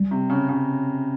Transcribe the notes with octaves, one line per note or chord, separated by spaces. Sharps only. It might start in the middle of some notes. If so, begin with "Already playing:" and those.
Already playing: G3
C3
C#3
C#3